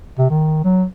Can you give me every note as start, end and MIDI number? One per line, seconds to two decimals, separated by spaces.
0.18 0.27 48
0.30 0.61 51
0.64 0.84 54